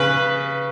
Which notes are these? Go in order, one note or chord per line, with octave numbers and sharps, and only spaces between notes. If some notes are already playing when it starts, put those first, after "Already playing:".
Already playing: C#3 B4